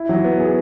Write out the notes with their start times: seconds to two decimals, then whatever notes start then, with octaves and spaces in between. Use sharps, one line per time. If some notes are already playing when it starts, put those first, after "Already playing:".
Already playing: E4
0.09 F#3
0.24 B3
0.40 G#4